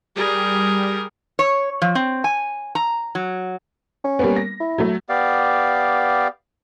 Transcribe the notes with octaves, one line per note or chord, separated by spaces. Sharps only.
G3 G#4 A#4
C#5
F3
C4
G#5
A#5
F#3
C#4
G3 A#3 B3
A#6
E4
F#3 A3
B3 G4 D5 F5